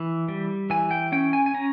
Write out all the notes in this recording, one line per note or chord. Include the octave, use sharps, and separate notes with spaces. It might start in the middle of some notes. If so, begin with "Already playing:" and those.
Already playing: E3
G3
E3 G#5
G5
C#4 G5
G#5
G#5
C#4 A#5